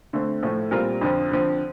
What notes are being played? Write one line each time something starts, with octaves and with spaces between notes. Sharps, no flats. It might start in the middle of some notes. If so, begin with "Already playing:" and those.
D3 A3 C4
A2 F3 A3
A#2 G3 C4 F4 A#4
F2 D3 F3
D3 F3 C4